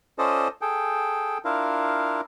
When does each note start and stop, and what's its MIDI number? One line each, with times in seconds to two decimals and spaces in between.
0.19 0.48 61
0.19 0.48 65
0.19 0.48 69
0.19 0.48 72
0.19 0.48 74
0.19 0.48 75
0.61 1.38 68
0.61 1.38 69
0.61 1.38 79
1.45 2.21 62
1.45 2.21 64
1.45 2.21 65
1.45 2.21 70
1.45 2.21 77